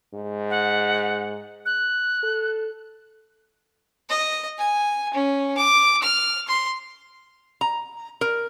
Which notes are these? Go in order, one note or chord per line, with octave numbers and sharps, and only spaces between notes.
G#2
F#5
F#6
A4
D#5
G#5
C#4
D6
F6
C6
A#5
A#4